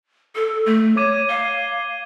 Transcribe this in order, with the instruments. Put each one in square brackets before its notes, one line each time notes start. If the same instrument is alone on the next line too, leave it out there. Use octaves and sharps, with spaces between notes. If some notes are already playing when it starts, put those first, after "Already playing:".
[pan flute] A4
A3
[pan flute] C#5 [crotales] D6 G#6 D#7
[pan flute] F5 [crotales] G7